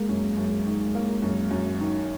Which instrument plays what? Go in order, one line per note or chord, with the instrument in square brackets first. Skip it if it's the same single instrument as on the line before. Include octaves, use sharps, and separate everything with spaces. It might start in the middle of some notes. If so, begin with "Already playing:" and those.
Already playing: [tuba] G#3 [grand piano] A#3
[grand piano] F#2
F#2
D#3
A#3
F#2
F#2
D#3